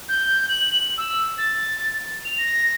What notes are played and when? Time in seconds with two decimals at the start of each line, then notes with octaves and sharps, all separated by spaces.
0.09 G6
0.49 F#7
0.98 E6
1.38 A6
2.25 F7
2.38 A#6